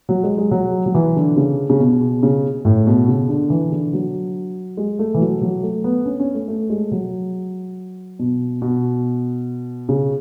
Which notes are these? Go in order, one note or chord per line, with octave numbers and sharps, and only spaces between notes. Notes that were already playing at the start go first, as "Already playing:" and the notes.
F#3
G#3
G#3
F#3
F#3
E3
D3
C#3
C#3
B2
C#3
A2
B2
C#3
D3
E3
D3
F#3
G#3
A3
E3
F#3
F#3
A3
B3
C#4
C#4
A3
A3
G#3
F#3
B2
B2
C#3